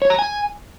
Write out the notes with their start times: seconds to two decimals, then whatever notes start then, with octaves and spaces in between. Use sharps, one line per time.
0.02 C#5
0.10 A#5
0.19 G#5